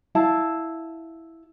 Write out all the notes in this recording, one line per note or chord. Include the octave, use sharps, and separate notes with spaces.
E4 F5 A5